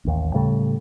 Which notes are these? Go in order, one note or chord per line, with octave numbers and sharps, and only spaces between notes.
A1 D#2
A2 C#3 G3 A3